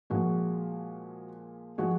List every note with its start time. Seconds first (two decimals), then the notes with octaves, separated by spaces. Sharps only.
0.10 A#2 F3 G#3 F#4
1.78 F3 G#3 F#4